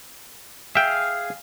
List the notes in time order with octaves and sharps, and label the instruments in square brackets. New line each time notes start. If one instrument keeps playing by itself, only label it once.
[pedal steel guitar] G#4 F5 [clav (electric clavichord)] E5 G5